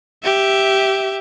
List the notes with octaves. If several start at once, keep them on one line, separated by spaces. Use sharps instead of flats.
G4 E5